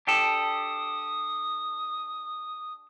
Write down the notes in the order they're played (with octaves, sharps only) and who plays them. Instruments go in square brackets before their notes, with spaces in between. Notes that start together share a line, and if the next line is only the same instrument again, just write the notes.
[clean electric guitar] D4 G4 A4 [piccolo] D#6